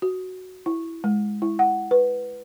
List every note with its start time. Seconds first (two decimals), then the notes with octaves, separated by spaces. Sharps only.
0.02 F#4
0.66 E4
1.04 G#3
1.42 E4
1.59 F#5
1.91 B4